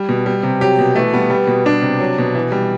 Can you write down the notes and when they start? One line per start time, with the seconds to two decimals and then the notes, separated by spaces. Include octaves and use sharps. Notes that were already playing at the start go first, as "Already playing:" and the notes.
Already playing: G3
0.09 B2
0.26 G3
0.43 C3
0.60 F#3 G4
0.79 B2
0.96 E3 A3
1.13 G3 B3
1.30 G3
1.47 B2
1.65 G3 D4
1.82 C3
2.00 F#3
2.18 B2
2.35 E3
2.52 G3